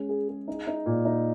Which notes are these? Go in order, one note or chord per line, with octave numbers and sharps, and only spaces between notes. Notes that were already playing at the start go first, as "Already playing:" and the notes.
Already playing: G#3 C#4
G#4
G#4
D#4
D#4
A#2
D#4